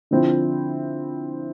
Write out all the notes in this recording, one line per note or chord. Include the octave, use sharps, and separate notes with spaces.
D3 F3 C4 E4